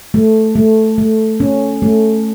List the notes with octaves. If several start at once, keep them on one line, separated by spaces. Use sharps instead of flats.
A3
A3
A3
C#4
A3